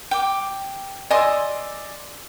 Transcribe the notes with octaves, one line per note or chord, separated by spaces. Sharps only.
G5 D6
D5 D#5 G#5 C6 D#6 E6